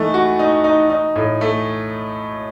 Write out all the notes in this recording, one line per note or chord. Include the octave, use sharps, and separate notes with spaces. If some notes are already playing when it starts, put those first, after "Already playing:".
Already playing: E3 A3 D#4
F#4
D#4
D#4
D#4
A2
A3